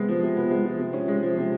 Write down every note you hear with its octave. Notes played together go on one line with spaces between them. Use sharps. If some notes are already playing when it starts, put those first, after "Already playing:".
Already playing: C3 G#3 B3
F3
C3
B3
G#3
F3
C3
C#4
G#3
F3
C3